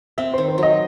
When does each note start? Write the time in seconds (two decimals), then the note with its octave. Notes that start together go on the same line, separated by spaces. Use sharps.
0.18 C4 E5
0.34 C5
0.38 D#3
0.48 C5
0.58 F#3 D#5